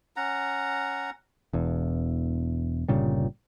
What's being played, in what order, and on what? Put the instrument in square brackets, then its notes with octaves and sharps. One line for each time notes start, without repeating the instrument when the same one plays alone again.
[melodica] C#4 F#5 A#5
[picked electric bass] E1 E2
G1 A#2 C#3 G3